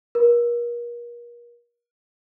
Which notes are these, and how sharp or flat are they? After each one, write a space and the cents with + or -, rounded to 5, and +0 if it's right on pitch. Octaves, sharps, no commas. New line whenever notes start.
A#4 +35